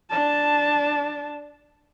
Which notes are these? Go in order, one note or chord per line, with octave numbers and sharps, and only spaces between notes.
D4 A5